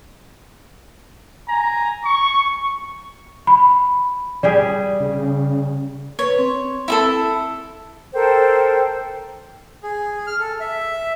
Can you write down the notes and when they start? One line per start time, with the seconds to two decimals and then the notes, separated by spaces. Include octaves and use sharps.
1.47 G#5 A#5
2.04 C#6
3.47 B5
4.43 G3 G4 G#4 D5
5.00 C#3
6.19 B4 C#5
6.38 C4
6.88 E4 G#4 A4
8.14 A4 A#4 C5 G5
9.83 G#4
10.27 F6
10.40 A4
10.60 E5